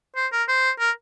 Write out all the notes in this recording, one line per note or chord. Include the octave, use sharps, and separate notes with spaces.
C5
A#4
C5
A#4